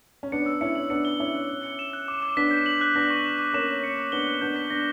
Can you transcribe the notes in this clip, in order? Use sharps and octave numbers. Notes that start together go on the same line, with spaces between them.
C#4
B3 D4 C#7
E6
C#4 E4 C#7
F#7
B3 D4 C#7
G7
C#4 E4 D6
F#6
F#6
C#7
E7
F#6
D6
D6
B3 D4 B6
G6
F#7
F#6
B3 D4 A#6
C#6
E7
D6
A#3 C#4 E7
E7
C#7
A#6
B3 D4 G7
F#6
B3 D4 G6
B6
B3 D4 A#6